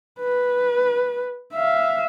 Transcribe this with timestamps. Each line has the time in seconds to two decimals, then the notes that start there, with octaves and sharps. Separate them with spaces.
0.20 B4
1.53 E5 F5